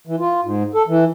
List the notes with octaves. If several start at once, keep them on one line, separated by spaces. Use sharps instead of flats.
E3
F4
G#2
A4
E3